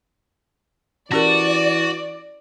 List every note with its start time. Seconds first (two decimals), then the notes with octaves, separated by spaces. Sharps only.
1.12 E3 C#4 F#4 G4 A#4 D5